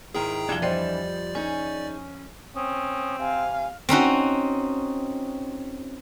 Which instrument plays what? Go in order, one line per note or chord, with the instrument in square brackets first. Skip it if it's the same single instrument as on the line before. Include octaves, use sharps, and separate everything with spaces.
[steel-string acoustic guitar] G#2 D#3 E4 [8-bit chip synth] G#4 G5 A#5
[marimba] F2 F3 [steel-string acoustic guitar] C3 G3 E4 [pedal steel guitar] E3 D4
[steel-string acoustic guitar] F3 G3 [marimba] C5 D#5 G5 [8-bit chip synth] D5
[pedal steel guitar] C#4 [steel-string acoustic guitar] D#4 G#4
[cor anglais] C4 [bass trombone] C#4 [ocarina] D#6
[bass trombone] C3 [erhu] F5 [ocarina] G#5
[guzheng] C4 C#4 D#4 F#4